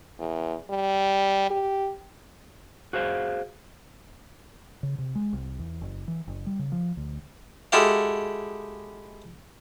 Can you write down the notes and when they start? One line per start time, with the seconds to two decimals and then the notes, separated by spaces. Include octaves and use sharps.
0.19 E2
0.70 G3
1.50 G4
2.93 F#4 G#4 C5 F5
4.83 C#3
4.98 C3
5.15 G#3
5.33 C2
5.59 E2
5.81 F#1
6.08 E3
6.27 F#1
6.46 G3
6.59 C#3
6.72 F3
6.97 D2
7.72 G#3 E4 F#4 G4 A4 F5